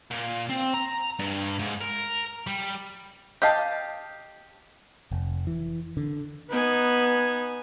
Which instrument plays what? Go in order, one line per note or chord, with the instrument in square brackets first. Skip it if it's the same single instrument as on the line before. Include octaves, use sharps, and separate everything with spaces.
[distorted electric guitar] A#2
C4
A#5
G2
G#2
A#4
G3
[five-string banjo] G4 D#5 F5 A5
[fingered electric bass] F1
E3
D3
[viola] B3 [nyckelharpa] D#4 G#5